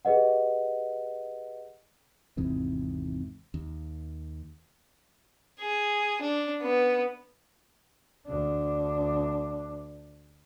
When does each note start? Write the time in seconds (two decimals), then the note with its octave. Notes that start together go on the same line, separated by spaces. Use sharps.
0.05 G4 G#4 B4 D#5 F#5
2.37 G#1 E2 G#2 C3
3.54 D#2
5.60 G#4
6.21 D4
6.62 B3
8.27 D2 D4